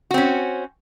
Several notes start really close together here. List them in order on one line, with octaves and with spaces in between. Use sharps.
F#4 C4 C#4